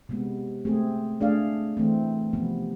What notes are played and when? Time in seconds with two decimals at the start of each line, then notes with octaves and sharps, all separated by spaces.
0.09 C3 G#3 B3
0.65 A3 C4 G#4
1.21 A3 D4 G#4 D5 F5
1.77 E3 A3 C4
2.33 C3 F3 B3